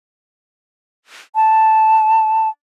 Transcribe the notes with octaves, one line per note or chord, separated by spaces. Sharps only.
A5